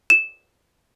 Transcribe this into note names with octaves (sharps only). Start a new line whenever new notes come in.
E7